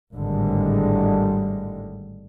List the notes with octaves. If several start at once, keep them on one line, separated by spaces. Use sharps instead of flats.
G#1 A2 D3 G3 G#3